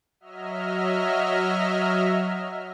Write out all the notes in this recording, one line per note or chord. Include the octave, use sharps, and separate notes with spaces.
F#3 D#5 E5 F6